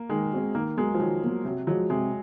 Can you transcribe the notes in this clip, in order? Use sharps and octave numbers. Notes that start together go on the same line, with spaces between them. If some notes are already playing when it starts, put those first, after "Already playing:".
Already playing: A#3
D#3 G#3
G#3 C4 F#4
D#3 A#3
F#3 G#3 A#3
F3
D#3 F#3
F#3 A#3
C3 F#3
F3 F#3 G#3
C3 G#3